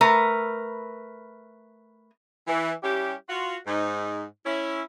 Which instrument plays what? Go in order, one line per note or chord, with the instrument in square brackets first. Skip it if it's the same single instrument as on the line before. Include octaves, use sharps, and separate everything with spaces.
[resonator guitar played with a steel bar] A3 A#4 B4 A#5
[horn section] E3
G3 C#4 E4 G4
F4 F#4
G#2 D#4
C#4 E4